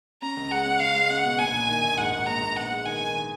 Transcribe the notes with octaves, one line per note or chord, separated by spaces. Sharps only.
C#4 A#5
C#2
G#3 F#5
C#4
C#2 F5
G#3
C#4 F#5
B2
A#1 G#5
A#1
D#3
A#1
G#2 F#5
G#2
A#1 A#5
A#1
B3 F#5
G#3
D#3 G#5
D#3
D#3